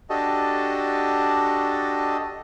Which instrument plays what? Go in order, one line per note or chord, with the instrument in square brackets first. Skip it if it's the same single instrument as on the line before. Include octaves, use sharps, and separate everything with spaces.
[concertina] D4 F#4 G4 A4 D#5 A5